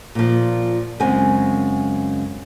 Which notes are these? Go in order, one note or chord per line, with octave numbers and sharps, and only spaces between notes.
A#2 F3
F#2 C#3 G#3 C4 G#5